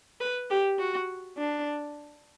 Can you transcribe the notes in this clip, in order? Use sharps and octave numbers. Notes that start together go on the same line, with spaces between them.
B4
G4
F#4
D4